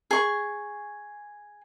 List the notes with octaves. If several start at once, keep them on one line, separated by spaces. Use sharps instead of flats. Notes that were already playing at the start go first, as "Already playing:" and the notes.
G#4 C#6